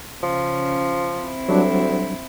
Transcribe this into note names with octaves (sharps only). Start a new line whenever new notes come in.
C#3 F3 C#4
C4 E4
D2 F#3 G3 D4